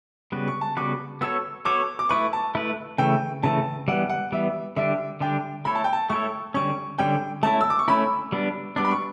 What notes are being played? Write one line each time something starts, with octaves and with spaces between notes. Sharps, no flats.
C#3 G3 B3 F#4 B4
C#6
A5
C#3 G3 B3 F#4 B4 D6
B3 F#4 A4 C#5 E6
B3 F#4 A4 C#5 D6
D6
A3 E4 B4 C#6
A5
A3 E4 B4
C#3 E3 A3 G5
C#3 E3 A3 A5
E3 G3 B3 F#5
F#5
E3 G3 B3 E5
D3 G3 D4 G4 E5
D3 G3 D4 G4 G5
A3 E4 A4 C#5 B5
A5
G5
A5
A3 E4 A4 C#5 C#6
D3 G3 C#4 C#6
D3 G3 C#4 G5
A3 C#4 E4 A5
E6
D6
C#6
A3 C#4 E4 B5
G3 B3 D4
G3 B3 D4 D6
B5
C#6